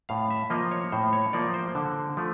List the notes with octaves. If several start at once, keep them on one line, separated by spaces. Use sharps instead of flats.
A2 F5
E5
F3 A#3 D#5
C#5
A2 C5
C#5
F3 A#3 D5
C5
D3
F3 A3